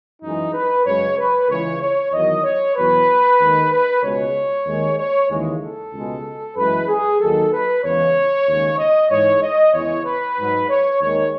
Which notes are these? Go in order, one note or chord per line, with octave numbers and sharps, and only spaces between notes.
F#2 E3 G#3 D#4
B4
F#2 C#3 G#3 C#5
B4
C#2 C#3 E3 G#3 C#5
C#5
E2 D#3 F#3 D#5
C#5
E2 B2 F#3 B4
D#2 D#3 G#3
B4
C#2 B2 G#3 C#5
D#2 D#3 G#3
C#5
D#2 C#3 E3 G#3
A4
C#2 B2 G#3
F#2 E3 G#3 B4
G#4
D#2 D#3 F#3 A4
B4
E2 C#3 E3 G#3 C#5
D#2 C#3 G#3
D#5
G#2 E3 G#3 C#5
D#5
E2 C#3 E3 G#3 C#5
B4
G#2 F#3
C#5
D#2 D#3 G#3 C#5